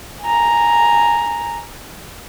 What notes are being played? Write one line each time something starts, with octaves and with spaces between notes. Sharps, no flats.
G#5 A#5